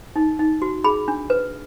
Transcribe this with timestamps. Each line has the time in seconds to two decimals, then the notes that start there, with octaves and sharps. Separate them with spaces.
0.16 D#4
0.39 D#4
0.62 F#4
0.84 G#4 B5
1.08 D4
1.30 B4